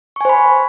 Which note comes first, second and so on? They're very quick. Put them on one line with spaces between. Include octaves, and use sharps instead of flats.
C#6 G#5 C5 B5